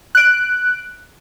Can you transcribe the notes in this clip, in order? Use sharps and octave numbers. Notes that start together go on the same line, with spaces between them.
F#6 D7